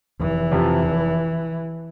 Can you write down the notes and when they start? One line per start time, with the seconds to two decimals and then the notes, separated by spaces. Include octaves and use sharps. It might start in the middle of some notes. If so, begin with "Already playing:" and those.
0.20 F1 E3
0.51 F2 C3 F3
0.83 F1